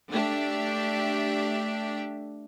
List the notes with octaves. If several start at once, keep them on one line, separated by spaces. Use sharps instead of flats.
A3 D4 G4 E5